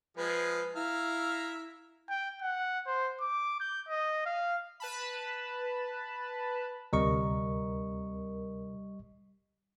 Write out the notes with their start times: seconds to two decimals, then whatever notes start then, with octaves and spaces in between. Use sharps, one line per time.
0.17 F3 G#3 B4
0.76 E4 E5 F5 A#5
2.09 G5
2.42 F#5
2.87 C5
3.20 D6
3.60 G6
3.88 D#5
4.25 F5
4.80 B4 A5 B5
6.93 D2 C3 G3 A#4 D#5 C#6